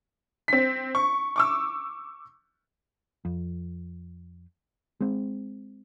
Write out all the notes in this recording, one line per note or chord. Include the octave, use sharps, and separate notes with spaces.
C4 B6
C#6
C#6 D6 E6
F2
G#3 C4